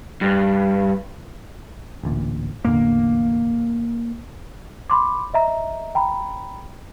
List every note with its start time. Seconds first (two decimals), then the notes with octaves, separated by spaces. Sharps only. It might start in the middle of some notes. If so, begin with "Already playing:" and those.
0.21 G2
2.03 A1 D2 A#2
2.65 A1 E2 D3 A#3
4.90 B5 C6 D6
5.34 D#5 E5 A#5
5.95 G5 A#5 B5